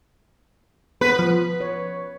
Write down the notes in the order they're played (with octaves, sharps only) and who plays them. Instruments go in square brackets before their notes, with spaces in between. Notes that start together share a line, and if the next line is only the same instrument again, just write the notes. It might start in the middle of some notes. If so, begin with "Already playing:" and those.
[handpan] B3 [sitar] B4
[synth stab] F3
[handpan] C#5